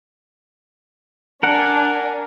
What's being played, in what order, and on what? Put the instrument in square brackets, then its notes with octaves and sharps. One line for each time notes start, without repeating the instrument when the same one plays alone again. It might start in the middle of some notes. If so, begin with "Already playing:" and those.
[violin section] D4 G#5 [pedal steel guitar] A#4 F#5